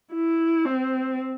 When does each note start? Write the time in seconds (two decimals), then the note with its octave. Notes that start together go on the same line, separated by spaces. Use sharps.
0.14 E4
0.65 C4